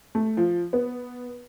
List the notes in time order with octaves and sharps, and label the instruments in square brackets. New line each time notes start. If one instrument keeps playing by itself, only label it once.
[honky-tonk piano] A3
F3
B3